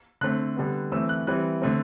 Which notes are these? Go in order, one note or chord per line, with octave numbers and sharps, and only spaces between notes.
D3 A3 C4 F#6
D3 G3 B3
E3 A3 C4 E6
F#6
E3 G3 C4 F#6
D3 A3 C4